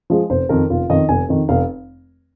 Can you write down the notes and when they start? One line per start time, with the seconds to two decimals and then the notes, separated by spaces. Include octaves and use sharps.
0.10 F3 G#3
0.30 F1 C5
0.49 F2 D#3 A#4
0.70 F1 F4
0.90 F2 D#3 D#5
1.09 F1 G#5
1.28 F2 D#3
1.49 F1 F5